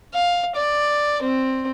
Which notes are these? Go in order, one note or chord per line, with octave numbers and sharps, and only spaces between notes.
F5
D5
C4